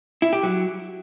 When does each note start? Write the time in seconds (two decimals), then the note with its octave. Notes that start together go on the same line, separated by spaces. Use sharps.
0.22 E4
0.33 G4
0.43 F#3